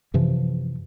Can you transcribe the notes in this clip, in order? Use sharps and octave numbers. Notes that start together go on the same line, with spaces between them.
F#2 C3 E3 F3